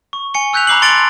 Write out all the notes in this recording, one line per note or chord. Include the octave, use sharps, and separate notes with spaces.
C#6
G#5 C#7 G7
G#5 E6 F#6 G6 B6 F7
A#5 B5 D6 C7 F#7
A5 C6 A6 C#7 D7 F#7